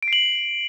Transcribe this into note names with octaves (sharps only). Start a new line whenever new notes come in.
D7
C7
F#7